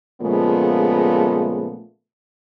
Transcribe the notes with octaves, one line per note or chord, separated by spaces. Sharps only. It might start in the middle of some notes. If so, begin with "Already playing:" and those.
A#2 C#3 F3 G#3 A3 B3